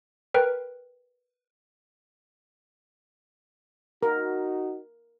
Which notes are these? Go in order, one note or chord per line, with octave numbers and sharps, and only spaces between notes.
A#4 B4 G5
D#4 F#4 A#4